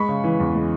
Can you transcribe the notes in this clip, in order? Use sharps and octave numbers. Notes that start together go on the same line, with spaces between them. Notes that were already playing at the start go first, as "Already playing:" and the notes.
Already playing: G#3 B5 C#6
C#3
E3
E2
G#3